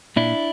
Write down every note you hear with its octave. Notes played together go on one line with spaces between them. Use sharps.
A#2 D4 E4